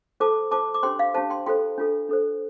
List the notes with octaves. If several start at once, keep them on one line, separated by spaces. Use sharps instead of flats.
F4 A4 C5 A5 D6
F4 C5 A5 D6
D6
D4 G4 C5 G5 C6
F5
D4 G4 C5 F5 A5
G5 C6
F4 A4 C5 G5 C6
D4 F4 A4
D4 A4 C5